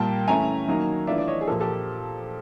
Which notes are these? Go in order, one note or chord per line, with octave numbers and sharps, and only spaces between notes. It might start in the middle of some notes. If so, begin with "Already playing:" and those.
Already playing: A#2 G3 A#3 G5 A5
E3 A3 C#4 G#5 A#5
D#3 F#3 A#3 D#4
E3 A3 D4 F4 D5 E5
D5
C#5 D#5
G#4
A#2 F3 A#3 G4 A4
G4 A4